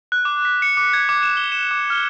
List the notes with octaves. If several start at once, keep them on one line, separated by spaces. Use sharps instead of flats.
F#6
D6
B6
C#7
D6
G#6
D6
E7
G7
E7
D6
F6